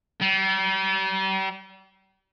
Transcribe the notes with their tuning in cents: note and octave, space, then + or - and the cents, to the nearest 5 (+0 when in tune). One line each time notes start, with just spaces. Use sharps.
G3 -40